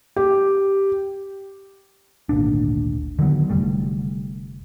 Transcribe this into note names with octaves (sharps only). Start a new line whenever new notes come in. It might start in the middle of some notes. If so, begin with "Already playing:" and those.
G4
G#1 D2 A#2 D4
D3 D#3 F#3 B3
F1 D3 G3 A3